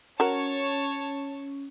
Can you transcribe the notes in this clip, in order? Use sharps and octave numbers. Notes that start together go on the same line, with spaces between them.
C#4 F#4 A#4 C#5 A5